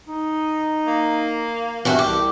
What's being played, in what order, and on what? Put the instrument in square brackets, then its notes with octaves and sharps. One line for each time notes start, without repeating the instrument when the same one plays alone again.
[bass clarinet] D#4
[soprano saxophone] A#3
[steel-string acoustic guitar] G2 F#4 E5 [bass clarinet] E3
[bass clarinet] C2 [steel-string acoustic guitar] G4